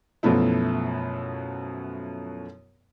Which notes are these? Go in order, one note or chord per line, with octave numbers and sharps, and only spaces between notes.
F#2 B2 F3 A3 B3 E4